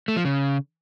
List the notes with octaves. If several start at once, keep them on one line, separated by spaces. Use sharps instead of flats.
A3
F3
C#3